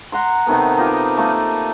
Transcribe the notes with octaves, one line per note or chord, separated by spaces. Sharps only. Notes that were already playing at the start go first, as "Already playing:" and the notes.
F#5 A#5 C6
C3 D#3 A3 B3
D#4 F4 G4
A3 A#3 D#4